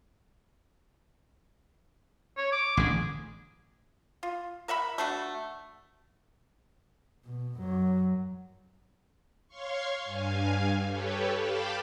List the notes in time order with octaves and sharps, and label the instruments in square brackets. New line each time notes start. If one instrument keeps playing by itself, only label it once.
[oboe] C#5
D6
[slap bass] A1 D3 [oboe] G#4
[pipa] F4
A#4 E5 F#5 B5
A3 D4 F#4
[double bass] B2
F#2 F#3
[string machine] C#5 F5 C6 C#6
G2 F5 G#5
G4 A4 B4 C#5
F5 G5 A5 B5 D6